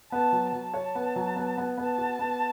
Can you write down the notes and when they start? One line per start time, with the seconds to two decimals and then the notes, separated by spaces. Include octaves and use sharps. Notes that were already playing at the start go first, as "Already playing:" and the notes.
0.12 B3 A5
0.32 F#3
0.53 F#3 A5
0.74 C#5
0.95 B3
1.16 F#3
1.36 B3
1.57 B3
1.77 B3 A5
1.98 F#4
2.19 B3